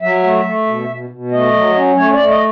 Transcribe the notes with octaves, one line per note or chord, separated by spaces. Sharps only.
F#3 E5
A3
A3
B2
B2
B2
A3 D#5
F#3
C#4
A3 C#5
A3 D5
D#5